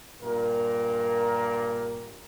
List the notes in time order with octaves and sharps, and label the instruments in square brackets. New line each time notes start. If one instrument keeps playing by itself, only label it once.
[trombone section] G2 A#2 A#4